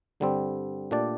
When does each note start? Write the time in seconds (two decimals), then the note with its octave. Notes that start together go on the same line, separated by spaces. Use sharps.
0.20 G2 D3 G3 C4
0.91 A#2 A3 D4 G4 D5